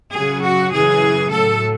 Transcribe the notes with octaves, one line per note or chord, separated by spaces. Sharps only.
F#2 C#3 F#3 G#4
F#4
F#2 C#3 E3 G#4
A2 F#3 A4